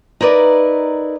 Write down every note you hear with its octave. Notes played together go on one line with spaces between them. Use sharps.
D#4 E4 A#4 B4 D5